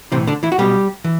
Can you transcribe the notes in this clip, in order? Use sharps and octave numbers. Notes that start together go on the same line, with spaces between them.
B1 A2 C3 E3 C4
D3 D4
E3 E4
F#4
B1 B2 G3 G4
E3